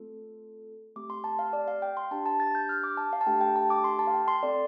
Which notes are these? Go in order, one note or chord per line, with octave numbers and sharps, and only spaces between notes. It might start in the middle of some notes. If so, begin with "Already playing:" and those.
Already playing: A3 C4 F4 A4
A3 C4 G4 D6
C6
A5
F5
D5
F5
G5
C6
D4 G4 A5
A5
A6
G6
F6
D6
A5
F5
A5
A3 D4 G4 G5
G5
A5
D6
C6
A5
F5
G5
C6
C4 A4 D5